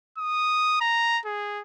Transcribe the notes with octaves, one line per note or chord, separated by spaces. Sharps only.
D#6
A#5
G#4